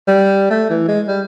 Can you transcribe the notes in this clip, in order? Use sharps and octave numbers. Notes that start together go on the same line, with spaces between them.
G3
A3
E3
G#3
G3